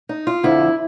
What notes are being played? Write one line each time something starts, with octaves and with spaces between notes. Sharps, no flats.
D#4
F4
F2 D3 F3 E4